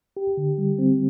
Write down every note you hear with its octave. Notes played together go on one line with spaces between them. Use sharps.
G4
D3
G3
C4